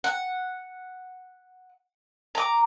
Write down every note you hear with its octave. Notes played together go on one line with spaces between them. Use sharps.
F#5
A#5 D6